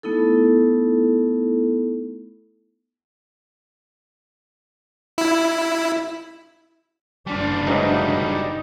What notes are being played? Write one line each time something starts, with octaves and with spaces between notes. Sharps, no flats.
A3 B3 D#4 E4 A4
E4
F#1 G3 D4 F4
G#2 E3 F#3 D#4